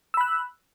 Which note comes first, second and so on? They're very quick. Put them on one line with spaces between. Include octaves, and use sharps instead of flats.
E6 B5 F#6